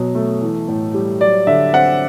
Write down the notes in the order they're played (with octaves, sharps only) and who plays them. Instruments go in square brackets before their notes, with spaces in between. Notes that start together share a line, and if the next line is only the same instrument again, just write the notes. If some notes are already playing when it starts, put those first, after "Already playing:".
Already playing: [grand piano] B2 F#3
A3
E3
A2
G3
F#3 D5
D3 E5
C4 F#5